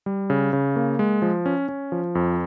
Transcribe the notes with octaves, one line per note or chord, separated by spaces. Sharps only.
G3
C#3
C#3
A#3
G#3
F3
C#4
C#4
F3
F2